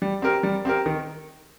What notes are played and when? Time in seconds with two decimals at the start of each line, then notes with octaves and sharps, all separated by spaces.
0.02 G3
0.22 C4 G4 A#4
0.43 G3
0.65 C4 G4 A#4
0.86 D#3